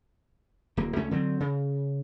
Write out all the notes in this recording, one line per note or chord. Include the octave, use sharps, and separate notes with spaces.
D1 A#3
C#2 A3 C#4
D3 F#3 C4
C#3